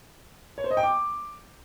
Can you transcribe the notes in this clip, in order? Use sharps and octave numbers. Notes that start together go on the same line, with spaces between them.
C#5
C5
D#5
G5
D6